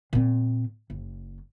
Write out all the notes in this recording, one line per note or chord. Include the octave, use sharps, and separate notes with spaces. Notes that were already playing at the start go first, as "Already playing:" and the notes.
A#2 C4
F#1